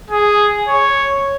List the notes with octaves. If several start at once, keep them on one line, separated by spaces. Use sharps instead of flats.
G#4
C#5